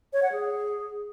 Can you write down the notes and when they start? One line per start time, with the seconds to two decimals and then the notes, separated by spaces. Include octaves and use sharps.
0.13 C#5
0.23 F#5
0.32 G#4